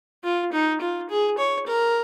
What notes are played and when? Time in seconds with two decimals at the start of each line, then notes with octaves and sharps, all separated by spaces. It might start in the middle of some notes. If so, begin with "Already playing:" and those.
0.24 F4
0.53 D#4
0.81 F4
1.09 G#4
1.38 C#5
1.67 A#4